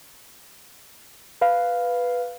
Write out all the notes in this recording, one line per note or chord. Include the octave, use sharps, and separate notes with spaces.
B4 F5